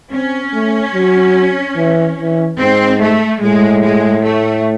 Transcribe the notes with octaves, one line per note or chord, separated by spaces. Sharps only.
C4 C#4
A3
F#3
E3
E3
G#2 C4
A3
A2 G#3
G#3
A3